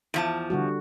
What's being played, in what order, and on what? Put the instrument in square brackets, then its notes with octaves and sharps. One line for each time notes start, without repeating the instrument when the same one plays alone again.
[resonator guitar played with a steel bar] E2 F3 A5
[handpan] D3 G3 F#4